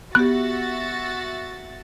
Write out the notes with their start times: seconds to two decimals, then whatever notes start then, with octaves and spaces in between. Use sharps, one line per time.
0.15 B3 F#4 G4 E5 F#6 A6